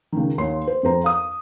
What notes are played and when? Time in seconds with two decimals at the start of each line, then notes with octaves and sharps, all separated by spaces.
0.12 C#2 D#3
0.38 D#2 C#5 C6
0.68 C5
0.83 F2 C4 C5 A#5
1.04 F5 D#6